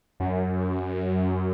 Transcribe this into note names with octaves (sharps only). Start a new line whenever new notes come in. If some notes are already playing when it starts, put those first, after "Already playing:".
F#2